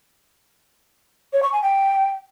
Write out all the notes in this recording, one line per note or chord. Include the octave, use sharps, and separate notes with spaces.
C#5
C#6
G#5
G5